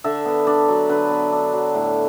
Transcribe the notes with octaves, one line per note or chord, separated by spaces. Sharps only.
D3 E5
B3
D4 D5
F#3
D3 B4
B3
D4
F#3
A2